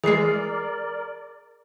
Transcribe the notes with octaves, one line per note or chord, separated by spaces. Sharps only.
E3 G#3 G#4 A#4 D5 C7